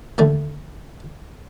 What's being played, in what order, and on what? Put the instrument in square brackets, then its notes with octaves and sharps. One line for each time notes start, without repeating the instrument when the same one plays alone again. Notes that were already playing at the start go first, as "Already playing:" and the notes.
[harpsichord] D#2 D3 A3